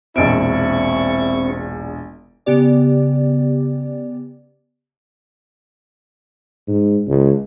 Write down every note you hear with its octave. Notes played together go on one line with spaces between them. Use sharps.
E1 A#1 C4 E4 C#6 D7
C#3 B3 G4 D5
G#2
C#2